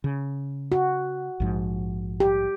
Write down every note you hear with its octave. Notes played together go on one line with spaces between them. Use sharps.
C#3
F#4
A#1 G#2 F3
G4